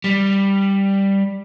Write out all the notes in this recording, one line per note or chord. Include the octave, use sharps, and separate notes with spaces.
G3